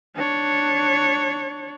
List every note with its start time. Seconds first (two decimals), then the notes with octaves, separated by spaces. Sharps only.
0.16 D4 C#5